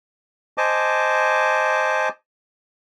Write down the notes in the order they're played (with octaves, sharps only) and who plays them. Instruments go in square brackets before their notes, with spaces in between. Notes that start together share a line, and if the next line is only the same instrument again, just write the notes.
[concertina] C5 D#5 G#5 A5 D6